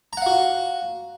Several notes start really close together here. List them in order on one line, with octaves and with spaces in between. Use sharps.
A#5 F#5 F5 F#4